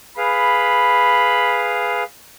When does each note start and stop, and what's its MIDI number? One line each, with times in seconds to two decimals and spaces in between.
0.17 2.03 68
0.17 2.03 71
0.17 2.03 77
0.17 1.82 83